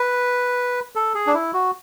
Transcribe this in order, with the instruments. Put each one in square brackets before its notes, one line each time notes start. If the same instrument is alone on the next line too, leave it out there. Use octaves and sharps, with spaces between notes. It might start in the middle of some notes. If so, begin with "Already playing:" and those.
Already playing: [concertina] B4
A4
G#4
D4
E4
F#4